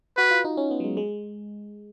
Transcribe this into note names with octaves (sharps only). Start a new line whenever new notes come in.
F#4 B4
F4
D#4
C#4
B3
F#3
G#3
G#3